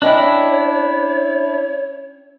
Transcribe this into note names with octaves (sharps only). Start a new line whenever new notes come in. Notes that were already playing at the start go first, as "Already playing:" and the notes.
C#4 D4 E4 C#5 D#5 G5